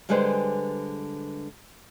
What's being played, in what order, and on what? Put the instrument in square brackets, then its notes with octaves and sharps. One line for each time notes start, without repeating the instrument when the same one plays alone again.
[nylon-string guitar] D3 G3 G#3 G#4 B4 C5